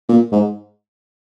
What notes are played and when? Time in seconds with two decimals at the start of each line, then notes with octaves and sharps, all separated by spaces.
0.09 A#2
0.32 G#2